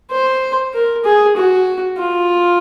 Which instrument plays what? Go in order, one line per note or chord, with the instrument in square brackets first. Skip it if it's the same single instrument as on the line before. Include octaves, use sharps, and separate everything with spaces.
[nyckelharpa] C5
A#4
G#4
F#4
F4